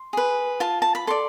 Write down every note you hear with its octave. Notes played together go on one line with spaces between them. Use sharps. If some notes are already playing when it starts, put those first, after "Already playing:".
Already playing: C6
G#4 B4
F4 A5
A5
B5
A4 D5 C6